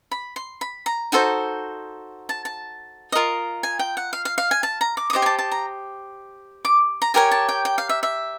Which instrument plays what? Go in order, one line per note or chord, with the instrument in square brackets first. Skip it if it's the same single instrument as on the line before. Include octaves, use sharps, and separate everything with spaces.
[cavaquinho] B5
C6
B5
A#5
D#4 F#4 A4 C5
A5
A5
F4 A#4 D#5
G#5
G5
F#5
F5
F5
F5
G#5
A5
A#5
D6
D#6
G4 C5 D#5 D6
G#5
A5
A5
A#5
D6
A#5
G4 A#4 C#5 G#5
A5
G5
G5
F5
E5
E5